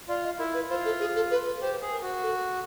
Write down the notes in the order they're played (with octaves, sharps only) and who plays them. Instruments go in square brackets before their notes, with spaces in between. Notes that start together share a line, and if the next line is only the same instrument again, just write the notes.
[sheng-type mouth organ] F4 [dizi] D5
[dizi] D#5
[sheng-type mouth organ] E4 [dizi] A#4
[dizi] B4
[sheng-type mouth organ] F4 [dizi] C5
[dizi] A4
G#4
A4
B4
B4
[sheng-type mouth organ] G4 [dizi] C5
[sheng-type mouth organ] G#4
[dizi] A#4
[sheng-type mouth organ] F#4
[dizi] A4